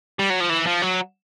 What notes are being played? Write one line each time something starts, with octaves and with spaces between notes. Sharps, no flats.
G3
F#3
F3
E3
F3
F#3